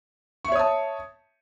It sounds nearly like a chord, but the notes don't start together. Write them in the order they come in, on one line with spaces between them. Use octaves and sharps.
C#6 E5 C#5 D#6 A5